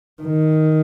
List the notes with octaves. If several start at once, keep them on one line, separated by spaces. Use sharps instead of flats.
D#3